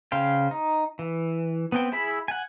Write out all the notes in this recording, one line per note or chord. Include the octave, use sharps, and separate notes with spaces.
C#3 C5 F5 G5
D#4
E3
B3 C4 G5
E4 G#4 E5 B5
F#5 G#5